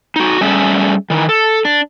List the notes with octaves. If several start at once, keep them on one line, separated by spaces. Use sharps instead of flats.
D#4 F#4
G3 A3 C#4 G#4 E5
D#3 E3
A4
D4